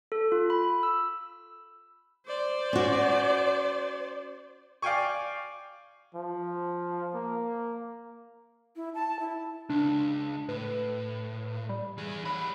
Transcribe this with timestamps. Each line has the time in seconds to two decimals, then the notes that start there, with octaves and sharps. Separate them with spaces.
0.12 A4
0.32 F4
0.50 B5
0.83 E6
2.27 C5 D5
2.73 C#4 F#4
4.82 D5 F5 G5 G#5 C#6
6.15 F3
7.14 A#3
8.76 E4
8.94 A5
9.20 E4
9.69 C#2 D4
10.49 A2 B4
11.69 G3
11.98 E3 G#4
12.25 G3 C#5 B5